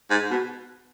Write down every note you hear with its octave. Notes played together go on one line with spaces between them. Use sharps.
G#2
B2